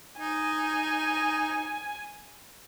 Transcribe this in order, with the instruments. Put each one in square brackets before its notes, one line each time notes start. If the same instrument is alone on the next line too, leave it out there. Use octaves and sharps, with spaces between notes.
[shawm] D#4 [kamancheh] G#5